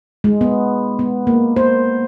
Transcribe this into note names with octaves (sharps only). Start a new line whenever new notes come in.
G#3
B3
B3
A#3
C5